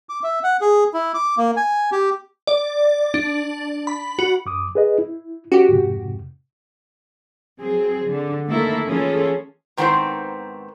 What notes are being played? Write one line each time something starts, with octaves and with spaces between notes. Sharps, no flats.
D6
E5
F#5
G#4
E4
D6
A#3
G#5
G4
D5
D4
B5
F#4
F#2 D6 D#6
G#4 B4 D#5
E4
C#4 F#4 G4
F2 G#2 C3
F#3 C4 G#4
D3
D#3 A3 A#3 E4 A4 A#4
E3 C#4 F4 G#4 A4
G#2 D#3 B3 C4 E4 C5